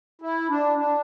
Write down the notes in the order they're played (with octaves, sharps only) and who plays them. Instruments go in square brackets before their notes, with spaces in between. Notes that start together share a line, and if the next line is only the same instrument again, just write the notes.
[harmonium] E4
D4
D4